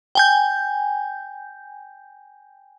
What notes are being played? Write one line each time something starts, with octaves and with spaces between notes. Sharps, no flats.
G5 G#5 G6